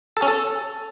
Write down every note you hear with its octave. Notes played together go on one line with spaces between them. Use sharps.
A4
C#4
A4